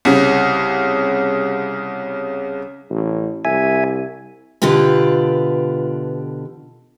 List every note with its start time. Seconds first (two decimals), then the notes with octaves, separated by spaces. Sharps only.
0.05 C2 C#3
2.90 A1
3.45 C2 E5 G#5
4.62 B2 D3 F4 G4 B4